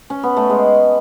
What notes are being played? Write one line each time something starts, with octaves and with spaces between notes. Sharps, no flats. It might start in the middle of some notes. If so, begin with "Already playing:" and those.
C#4
B3
A3
G#3